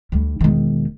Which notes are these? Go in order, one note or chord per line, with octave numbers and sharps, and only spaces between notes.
D2 G3
E1 D#3